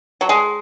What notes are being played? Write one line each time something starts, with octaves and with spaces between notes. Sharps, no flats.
F#3
G#3